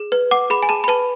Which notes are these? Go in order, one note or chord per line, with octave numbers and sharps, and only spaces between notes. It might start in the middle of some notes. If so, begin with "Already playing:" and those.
Already playing: G#4
B4
F#5 D6
G#4 B5
G#5
G#4 A5
B5
B4 A5